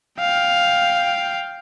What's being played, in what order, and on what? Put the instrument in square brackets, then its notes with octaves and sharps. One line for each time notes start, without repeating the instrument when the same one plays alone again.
[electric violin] F5 G5